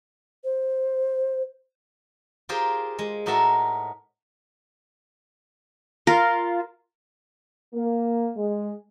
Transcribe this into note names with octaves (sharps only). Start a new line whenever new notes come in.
C5
F4 G4 G#4 A#4 C5
G#3
A2 D#4 F#4 A#4 E5 A5
F4 A#4
A#3
G#3